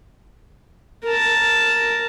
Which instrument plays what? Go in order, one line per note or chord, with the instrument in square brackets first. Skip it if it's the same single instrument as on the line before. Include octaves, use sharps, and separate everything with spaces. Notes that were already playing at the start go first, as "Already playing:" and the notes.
[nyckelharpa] A#4 A5